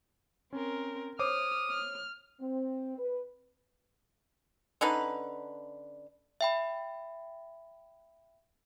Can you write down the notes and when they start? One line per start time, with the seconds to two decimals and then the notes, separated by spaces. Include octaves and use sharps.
0.53 C4 C#4 A#4
1.19 C5 C#5 D6 D#6 F6
1.71 F6
2.40 C4
2.98 B4
4.81 D3 C#4 D#4 B4
6.41 E5 G5 B5